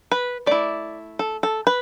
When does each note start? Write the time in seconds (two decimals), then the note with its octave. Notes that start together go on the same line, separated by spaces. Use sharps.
0.12 B4
0.46 A3 E4 D5
1.19 A4
1.43 A4
1.67 B4